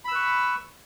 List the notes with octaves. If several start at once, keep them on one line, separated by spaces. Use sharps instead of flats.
B4 B5 C#6 E6